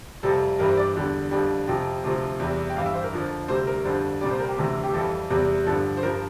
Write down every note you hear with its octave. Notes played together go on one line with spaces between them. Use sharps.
F2 C3 G3 A4
G2 E3 G3 A#4
C5
D5
E2 D3 G3
F2 D3 G3
F2 C3 F3 G5
D2 C3 F3
E2 C3 E3 G3
G5
G2 E3 G3 F5
E5
C5
A#4
F2 D3 F3
D2 C3 G3 C5
A#4
F2 D3 G3 C5
C2 A#2 G3 D5
C5
A#4
G4
D2 C3 E3
G4
F2 E3 G3 A4
E2 C3 G3
G2 D3 F3 A4
C5
G2 F3 A#4